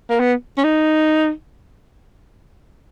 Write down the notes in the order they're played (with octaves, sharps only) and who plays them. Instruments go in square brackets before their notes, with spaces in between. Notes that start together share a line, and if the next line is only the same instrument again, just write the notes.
[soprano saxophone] A#3
B3
C#4
D#4